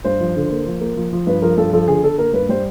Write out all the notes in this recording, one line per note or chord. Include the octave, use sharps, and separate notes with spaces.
G2 C5
F3
D3
A#3
F3
A#3
F3
F3
G2 B4
F3 A#4
G2 A4
F3 A4
D3 G#4
D3 A4
A#3 A#4
G2 B4
G3 C5